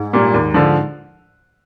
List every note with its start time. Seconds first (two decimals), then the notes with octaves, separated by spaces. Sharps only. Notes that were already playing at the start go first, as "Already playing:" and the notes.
Already playing: G#2
0.13 A#2 G3 A#3
0.34 D#2
0.54 D3 F3